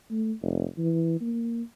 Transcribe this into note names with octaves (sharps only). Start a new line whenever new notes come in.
A3
F1
E3
A#3